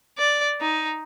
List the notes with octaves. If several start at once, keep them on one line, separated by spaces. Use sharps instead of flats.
D5
D#4